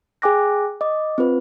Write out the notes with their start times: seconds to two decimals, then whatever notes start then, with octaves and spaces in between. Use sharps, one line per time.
0.22 G#4 G5 G#5 D6 F#6 A#6
0.81 D#5 D6
1.18 C4 F4 B4